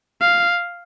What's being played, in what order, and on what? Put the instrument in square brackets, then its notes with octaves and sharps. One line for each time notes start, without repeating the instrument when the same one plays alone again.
[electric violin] F5